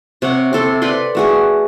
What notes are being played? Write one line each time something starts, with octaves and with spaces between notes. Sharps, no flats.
C3 C#5 F#5
C3 A4 C6
B4 D5 G5 C6
A3 F#4 G#4